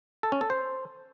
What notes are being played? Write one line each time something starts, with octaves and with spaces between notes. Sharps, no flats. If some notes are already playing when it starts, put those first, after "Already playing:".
A4
C#4
A4
C5